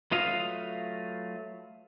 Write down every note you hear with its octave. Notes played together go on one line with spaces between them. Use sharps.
F#3 A3 F4 B4 D#5 F5